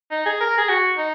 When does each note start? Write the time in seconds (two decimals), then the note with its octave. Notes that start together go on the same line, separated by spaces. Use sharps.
0.11 D#4
0.25 G#4
0.40 A#4
0.57 G#4
0.69 F#4
0.97 D#4